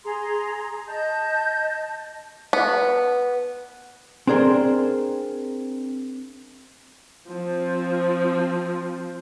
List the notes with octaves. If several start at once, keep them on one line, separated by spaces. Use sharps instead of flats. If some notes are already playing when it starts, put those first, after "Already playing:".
G#4 A#5 C6
D#5 A5 G6
B3
C4 D4 G#4 A#4 C5
F3 C4